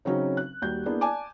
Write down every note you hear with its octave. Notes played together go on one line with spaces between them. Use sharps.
C#3 F#3 C4 C#4 D#4
F#6
D#2 G3 F#4 G6
A#3 B3 D4 E4 G#4
D5 G#5 A5 D6